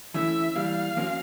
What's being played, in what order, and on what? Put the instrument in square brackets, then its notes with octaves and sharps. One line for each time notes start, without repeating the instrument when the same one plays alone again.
[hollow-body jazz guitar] E3 A3 C#4 E4 [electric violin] E5
[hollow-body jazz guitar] E3 G3 A#3 [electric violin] F5
[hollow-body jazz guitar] F3 A#3 C#4 F#4